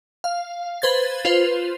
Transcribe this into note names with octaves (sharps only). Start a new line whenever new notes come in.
F5
B4 C5 G#6 A6
F4 B4 C5